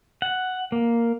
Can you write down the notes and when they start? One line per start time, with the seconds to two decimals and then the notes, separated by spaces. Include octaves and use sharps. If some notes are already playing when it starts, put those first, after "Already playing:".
0.22 F#5
0.72 A#3